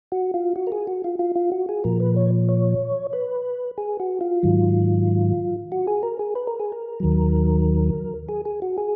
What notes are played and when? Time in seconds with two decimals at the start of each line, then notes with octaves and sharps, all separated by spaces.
0.12 F#4
0.34 F4
0.56 F#4
0.67 A#4
0.72 G#4
0.87 F#4
1.04 F4
1.19 F4
1.36 F4
1.52 F#4
1.69 G#4
1.84 A#2 F3 A#4
2.00 B4
2.16 C#5
2.49 C#5
3.13 B4
3.78 G#4
4.00 F#4
4.21 F4
4.43 G#2 D#3 F#3
5.72 F#4
5.87 G#4
6.03 A#4
6.19 G#4
6.35 B4
6.47 A#4
6.59 G#4
6.72 A#4
7.00 D#2 D#3 F#3
8.29 G#4
8.45 G#4
8.62 F#4
8.78 G#4